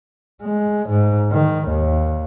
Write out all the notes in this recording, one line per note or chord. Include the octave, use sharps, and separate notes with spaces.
G#3
G#2
D#3
D#2